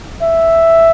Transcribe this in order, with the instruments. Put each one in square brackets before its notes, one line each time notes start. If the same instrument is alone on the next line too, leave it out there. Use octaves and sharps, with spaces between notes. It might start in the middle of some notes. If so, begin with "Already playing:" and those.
[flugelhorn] E5